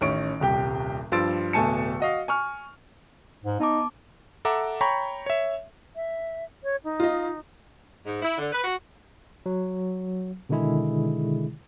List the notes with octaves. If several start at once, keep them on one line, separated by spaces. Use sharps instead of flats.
A1 D#3 C#4 C#6 D7
D#1 C2 G4 G5
G2 F3 C6 E6 A6 D7
D1 B2 A3 G#5 A5 C#7
F#4 D#5 F5
G#5 C#6 F6
G#2
B3 D#4 A5 D6
A4 E5 F#5 A#5 D6
C#5 G5 A#5 B5 C#6
C#5 E5
E5
C#5
D#4
F4 D#5
G#2
E4
D3
B4
F#4
F#3
B2 D3 D#3 G#3 E4 G#4